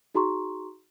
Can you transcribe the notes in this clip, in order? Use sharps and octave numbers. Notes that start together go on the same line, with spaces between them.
D#4 F#4 G#4 A#5 C6 C#6